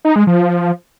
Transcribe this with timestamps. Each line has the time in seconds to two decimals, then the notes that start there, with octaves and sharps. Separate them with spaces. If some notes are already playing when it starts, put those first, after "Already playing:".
0.05 D#4
0.16 G#3
0.27 F3